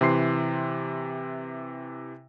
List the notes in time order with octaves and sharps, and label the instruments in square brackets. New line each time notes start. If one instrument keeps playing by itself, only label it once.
[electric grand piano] C3 E3 C6 C7